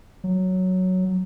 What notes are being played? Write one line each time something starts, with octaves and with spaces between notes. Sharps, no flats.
F#3